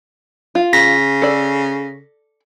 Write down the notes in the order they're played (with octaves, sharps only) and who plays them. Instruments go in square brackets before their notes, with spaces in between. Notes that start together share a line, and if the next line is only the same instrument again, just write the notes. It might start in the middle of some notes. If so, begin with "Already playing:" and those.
[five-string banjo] F4
[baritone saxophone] C#3 [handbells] A#6 B6
[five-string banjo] A4 D5